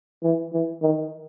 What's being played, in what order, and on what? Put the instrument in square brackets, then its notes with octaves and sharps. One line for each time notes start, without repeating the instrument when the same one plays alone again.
[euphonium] E3
E3
D#3